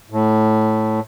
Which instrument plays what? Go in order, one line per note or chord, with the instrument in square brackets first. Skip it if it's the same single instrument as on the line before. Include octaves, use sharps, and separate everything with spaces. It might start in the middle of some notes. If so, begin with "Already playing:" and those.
[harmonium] A2